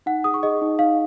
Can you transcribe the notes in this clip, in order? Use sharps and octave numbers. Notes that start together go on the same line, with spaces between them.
D#4 F#5
G#4 D#6
C#6
G#4 D#5
D#4
D#4 F5